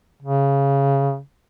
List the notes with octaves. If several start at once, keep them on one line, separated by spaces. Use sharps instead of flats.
C#3